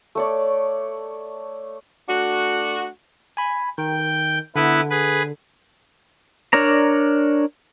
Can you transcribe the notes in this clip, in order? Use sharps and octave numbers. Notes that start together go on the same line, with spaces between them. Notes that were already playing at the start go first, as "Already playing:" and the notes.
A3 C#5 D5
A3 D4 F#4
G#5 B5
D#3 G5
D3 B3 E4 B4
G#4 B4
D4 A#4 C#5 D5 A#5